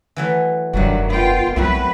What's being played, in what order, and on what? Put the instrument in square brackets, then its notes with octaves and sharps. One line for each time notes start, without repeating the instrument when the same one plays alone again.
[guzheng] E3 F#3 A3
[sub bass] F1 [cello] G2 F#3 [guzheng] D#3 A3 F#4
[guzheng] B3 [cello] F4 G5
[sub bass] C2 [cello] F#3 B4 [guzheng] A3 C4 F#4